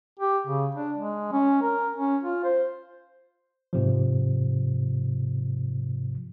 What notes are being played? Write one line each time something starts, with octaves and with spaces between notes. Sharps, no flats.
G4
C#3
D4
G#3
C#4
A#4
C#4
F4
C5
G#2 C3 F3